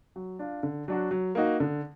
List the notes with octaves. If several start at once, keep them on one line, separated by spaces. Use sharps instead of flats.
F#3
D4 F4
D3
F#3 D4 F#4
F#3
A#3 D#4 F#4
D3